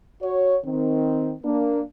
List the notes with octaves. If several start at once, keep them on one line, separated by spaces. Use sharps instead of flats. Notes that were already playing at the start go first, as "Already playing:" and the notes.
F#4 C#5
D#3 C4
A#3 D4